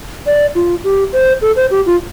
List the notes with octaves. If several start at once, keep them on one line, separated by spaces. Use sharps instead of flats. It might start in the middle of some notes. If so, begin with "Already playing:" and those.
D5
F4
G4
C5
A4
C5
G4
F4